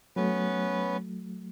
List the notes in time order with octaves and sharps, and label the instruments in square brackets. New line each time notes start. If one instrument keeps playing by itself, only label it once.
[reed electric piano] F#3 A3 [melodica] B3 C#4 B4